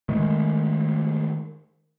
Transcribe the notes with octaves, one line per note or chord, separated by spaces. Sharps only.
D#3 G#3 A3